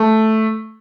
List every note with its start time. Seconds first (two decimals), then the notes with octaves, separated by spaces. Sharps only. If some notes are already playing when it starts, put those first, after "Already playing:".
Already playing: A3